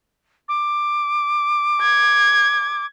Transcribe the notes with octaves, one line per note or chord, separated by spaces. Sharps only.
D6
G#6